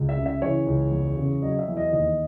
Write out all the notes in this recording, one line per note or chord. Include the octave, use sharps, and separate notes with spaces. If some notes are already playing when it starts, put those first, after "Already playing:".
Already playing: C#2
E5
C#3
E5
E3 C#5
C#2
E2
C#3
F#3 D#5
E5
E2
D#5
D#2 D#5